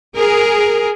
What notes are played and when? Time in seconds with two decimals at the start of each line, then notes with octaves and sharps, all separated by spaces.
0.16 G#4 A#4